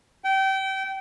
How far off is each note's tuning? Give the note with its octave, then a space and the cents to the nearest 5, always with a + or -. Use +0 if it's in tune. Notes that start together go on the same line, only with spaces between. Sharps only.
G5 -25